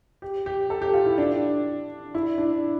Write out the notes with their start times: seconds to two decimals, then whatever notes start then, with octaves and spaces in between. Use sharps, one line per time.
0.22 G4
0.46 G4
0.70 A4
0.82 G4
0.94 F4
1.06 E4
1.18 D4
2.14 E4
2.38 D4